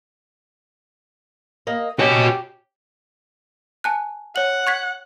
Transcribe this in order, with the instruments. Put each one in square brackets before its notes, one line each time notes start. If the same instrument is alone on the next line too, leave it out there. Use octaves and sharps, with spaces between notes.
[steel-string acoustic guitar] A#3 D#5
[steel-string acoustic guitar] C#4 [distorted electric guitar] F#4 D#5 [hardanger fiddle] G4
[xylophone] G#5 A5 F#6
[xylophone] C#5 F#7 [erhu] F#5
[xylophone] C#6 G#6 B6